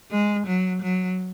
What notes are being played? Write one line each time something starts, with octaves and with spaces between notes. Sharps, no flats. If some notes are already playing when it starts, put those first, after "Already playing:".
G#3
F#3
F#3